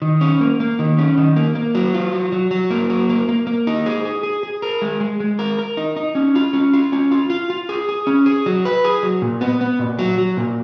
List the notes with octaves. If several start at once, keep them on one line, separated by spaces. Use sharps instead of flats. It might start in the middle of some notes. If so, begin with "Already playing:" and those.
D#3
C#4
A#3
A#3
D#3
C#4
D#3
A#3
A#3
F#3
F4
F#3
F#3
F#3
A#3
F#3
A#3
A#3
A#3
D#4
G#4
G#4
G#4
G#4
A#4
G#3
G#3
G#3
A#4
A#4
D#4
D#4
C#4
F4
C#4
F4
C#4
F4
F4
F4
G#4
G#4
C#4
G#4
F#3
B4
G#4
F#3
A#2
B3
B3
A#2
F#3
F#3
A#2